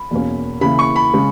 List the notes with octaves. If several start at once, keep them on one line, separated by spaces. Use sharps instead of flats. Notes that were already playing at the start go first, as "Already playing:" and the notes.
Already playing: B5
E2 B2 A#3 C#4
C#3 E3 A#3 E4 B5
C#6
B5
C#3 G#3